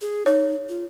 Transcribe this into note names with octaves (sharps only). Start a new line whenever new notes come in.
G#4
D#4 C#5
F4